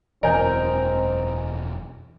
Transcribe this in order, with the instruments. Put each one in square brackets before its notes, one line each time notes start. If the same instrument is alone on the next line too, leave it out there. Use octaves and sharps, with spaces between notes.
[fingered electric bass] E1 F#2 E3 [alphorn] C4 [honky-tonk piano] A#4 [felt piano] D#5 G#5 G6